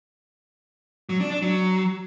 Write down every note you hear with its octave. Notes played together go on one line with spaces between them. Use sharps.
F#3
D4
D4
F#3